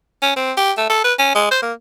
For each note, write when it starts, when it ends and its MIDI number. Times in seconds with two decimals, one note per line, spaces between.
0.22 0.33 61
0.36 0.52 60
0.57 0.72 67
0.78 0.90 57
0.90 1.02 69
1.04 1.13 71
1.19 1.31 61
1.35 1.49 56
1.51 1.59 72
1.62 1.73 58